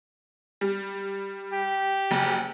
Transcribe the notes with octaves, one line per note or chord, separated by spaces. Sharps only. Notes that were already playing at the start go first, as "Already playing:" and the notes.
G3
G4
F#1